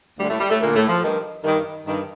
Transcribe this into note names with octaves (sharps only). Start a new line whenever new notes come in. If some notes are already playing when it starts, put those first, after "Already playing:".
D2 D3 G3
A2 A3
G3
A2 A3
D2 A#2 D3 A#3
A2 A3
F3
G2 D#3
G2 D#3
G2 D#3